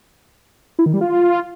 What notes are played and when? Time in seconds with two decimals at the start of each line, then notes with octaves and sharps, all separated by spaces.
0.79 E4
0.86 D#3
0.94 G3
1.01 F4